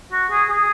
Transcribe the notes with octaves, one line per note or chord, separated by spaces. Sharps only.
F#4
G#4
G#4